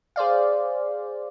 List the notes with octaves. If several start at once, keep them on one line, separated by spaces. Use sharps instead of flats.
G#4 C5 D5 F5